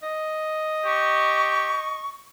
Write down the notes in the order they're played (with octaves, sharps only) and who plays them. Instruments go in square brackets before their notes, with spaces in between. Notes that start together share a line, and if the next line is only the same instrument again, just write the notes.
[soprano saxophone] D#5
[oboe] G4 [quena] C#6